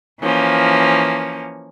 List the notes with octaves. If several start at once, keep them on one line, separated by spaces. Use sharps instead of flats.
E3 F3 A#3 C#4